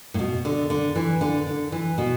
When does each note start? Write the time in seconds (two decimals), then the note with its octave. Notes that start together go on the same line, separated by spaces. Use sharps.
0.14 A2
0.19 B2
0.45 D3
0.70 D3
0.96 E3
1.21 D3
1.47 D3
1.72 E3
1.98 B2